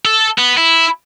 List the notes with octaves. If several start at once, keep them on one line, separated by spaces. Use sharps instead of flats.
A4
B3
E4